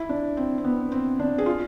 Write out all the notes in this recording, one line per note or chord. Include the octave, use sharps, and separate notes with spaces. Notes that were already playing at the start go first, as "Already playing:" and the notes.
Already playing: E4
D4
C4
C4
B3
C4
D4
G#4
F4